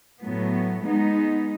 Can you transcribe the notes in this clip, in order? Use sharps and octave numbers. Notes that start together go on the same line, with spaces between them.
A2 F#3 B3
G#3 B3 D#4